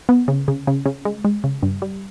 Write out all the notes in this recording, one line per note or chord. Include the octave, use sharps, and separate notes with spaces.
B3
C#3
C#3
C#3
C#3
G#3
G#3
C#3
G2
G3